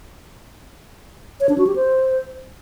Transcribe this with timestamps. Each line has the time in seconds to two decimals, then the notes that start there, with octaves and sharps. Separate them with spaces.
1.40 C#5
1.49 D4
1.58 F#4
1.67 G4
1.76 C5